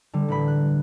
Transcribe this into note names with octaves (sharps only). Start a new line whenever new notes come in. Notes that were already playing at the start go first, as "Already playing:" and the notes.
D3 G3
A1 B4 B5
F#6